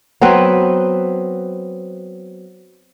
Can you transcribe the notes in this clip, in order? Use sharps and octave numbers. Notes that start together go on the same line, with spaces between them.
F#3 B3 C4 B4